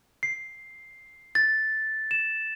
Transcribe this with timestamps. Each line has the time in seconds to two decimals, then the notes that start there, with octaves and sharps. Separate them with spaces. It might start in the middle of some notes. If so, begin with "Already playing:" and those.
0.23 C7
1.35 A6
2.11 E7